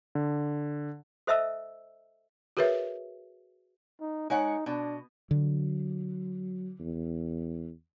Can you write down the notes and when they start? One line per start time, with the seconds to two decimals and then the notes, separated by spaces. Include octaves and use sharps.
0.15 D3
1.27 A4 C5 D#5 E5 A5 E6
2.57 F#4 G#4 A#4 B4 C#5 E5
4.01 D#4
4.30 G#3 D#4 C#5 F#5
4.66 B2 D4
5.31 D3 F#3
6.80 E2